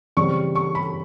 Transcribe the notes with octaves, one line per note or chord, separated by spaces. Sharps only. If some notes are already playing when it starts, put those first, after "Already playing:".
C#3 E3 G3 C4 C#6
C#6
B5